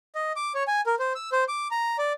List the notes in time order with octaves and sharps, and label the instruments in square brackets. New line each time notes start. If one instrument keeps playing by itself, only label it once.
[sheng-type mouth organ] D#5
D6
C#5
G#5
A#4
C5
E6
C5
D6
A#5
D5